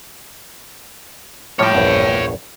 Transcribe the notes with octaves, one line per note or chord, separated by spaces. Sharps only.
A2 F3 G3 C#5 G5
A#1 E2 G2